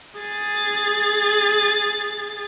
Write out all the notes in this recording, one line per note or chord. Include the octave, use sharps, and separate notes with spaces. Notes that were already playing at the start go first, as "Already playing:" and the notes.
G#4 A6